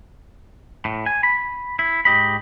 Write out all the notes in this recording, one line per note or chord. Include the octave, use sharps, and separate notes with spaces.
A2
G#5
B5
E4
G#2 G4 D#5 B5